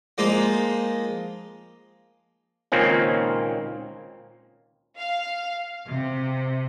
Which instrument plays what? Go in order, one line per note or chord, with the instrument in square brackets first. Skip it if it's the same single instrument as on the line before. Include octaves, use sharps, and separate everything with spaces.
[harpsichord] F3 G#3 A#3 D#4
[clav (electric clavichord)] C#2 A#2 D#3 A#3 C4 C#4
[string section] F5
C3